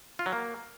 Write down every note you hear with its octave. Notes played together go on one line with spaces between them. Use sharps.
F4
F#3
A#3